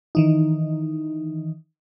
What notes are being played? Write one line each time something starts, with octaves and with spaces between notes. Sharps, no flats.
D#3 E3 D#4